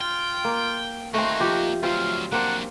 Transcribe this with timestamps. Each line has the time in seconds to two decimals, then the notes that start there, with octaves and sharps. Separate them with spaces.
0.01 F4 G5
0.45 A#3
1.14 A3 A#3 C4 D#4 F#4
1.40 F3 C4 G4
1.83 D2 F#3 C4 F4 B4 F5
2.32 F#3 A#3 C4 D4 F#5